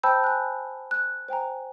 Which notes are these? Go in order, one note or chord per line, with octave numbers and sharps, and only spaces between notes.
C5 G5 A5 B5 E6 G6
G#5 F#6
F#6
C5 G5 G#5 A#5